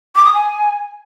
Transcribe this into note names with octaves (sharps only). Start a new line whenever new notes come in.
D6
D#6
G#5